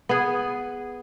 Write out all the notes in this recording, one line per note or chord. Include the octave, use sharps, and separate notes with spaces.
B3 G#4